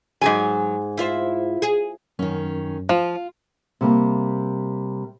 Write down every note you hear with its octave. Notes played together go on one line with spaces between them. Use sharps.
G#2 F#3 G#4 G#5
E4 F4 C5
G#4
F#2 D#3 C#4
F3 F4
C3 G3 A#3